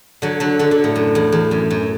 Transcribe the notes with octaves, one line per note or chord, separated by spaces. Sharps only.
D3 F#3
D3 F#3
D3 F#3
D3
A2
F#2
E2
E2
F#2
F#2